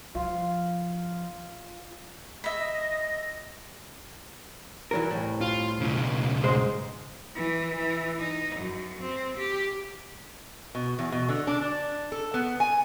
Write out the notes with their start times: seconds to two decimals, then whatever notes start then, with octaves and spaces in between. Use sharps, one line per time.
0.15 F3 F4
2.44 D#5 E5 B5
4.91 E3 F#3 A#4
5.11 C2 A2
5.41 F4
5.81 B1 C#3
6.44 G#2 G#3 C5
7.35 E3
7.76 E3
8.18 D#4
8.56 F#2
9.01 C4
9.38 G4
10.75 B2
10.99 E2
11.12 B2
11.29 D3
11.47 D4
11.61 D4
12.12 A4
12.34 B3
12.60 G#5